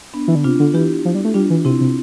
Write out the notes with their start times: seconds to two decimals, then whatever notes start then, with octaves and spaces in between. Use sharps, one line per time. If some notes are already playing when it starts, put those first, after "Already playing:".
0.14 B3 D4
0.28 E3
0.35 D3
0.44 C3 D4 F4
0.59 D3
0.74 E3 E4 G4
1.05 F3
1.15 G3
1.25 A3
1.34 G3 D4 F4
1.50 E3
1.65 C3 C4 E4
1.81 C3